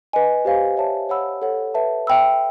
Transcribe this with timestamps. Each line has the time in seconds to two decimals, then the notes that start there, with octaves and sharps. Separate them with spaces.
0.13 B4 D#5 G#5
0.45 G4 C5 F5 G#5
0.77 C#5 E5 A5
1.09 C#5 F#5 B5 E6
1.42 A4 C#5 F#5
1.74 B4 E5 A5
2.07 E5 G5 B5 E6